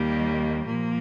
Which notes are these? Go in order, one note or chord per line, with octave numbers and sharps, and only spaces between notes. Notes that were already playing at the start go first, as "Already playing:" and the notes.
Already playing: D#2 D#3 G3 A#3
A#2 F3 A#3